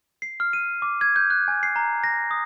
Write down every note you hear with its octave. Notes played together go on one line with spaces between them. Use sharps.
C7
F6
D#7
D6
G#6
G6
F#6
G#5
C7
A#5
A#6
D#6